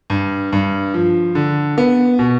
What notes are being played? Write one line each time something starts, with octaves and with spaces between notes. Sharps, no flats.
G2
G2
F3
D3
B3
B2